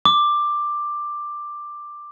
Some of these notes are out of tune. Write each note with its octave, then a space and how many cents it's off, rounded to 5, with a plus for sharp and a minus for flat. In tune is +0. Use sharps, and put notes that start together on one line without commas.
D6 +10